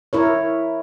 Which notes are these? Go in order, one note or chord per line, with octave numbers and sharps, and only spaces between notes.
E4 A#4 C#5